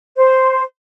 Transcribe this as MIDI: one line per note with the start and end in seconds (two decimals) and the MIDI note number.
0.17 0.62 72